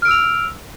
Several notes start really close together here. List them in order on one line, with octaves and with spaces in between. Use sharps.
F6 D7 E6 F7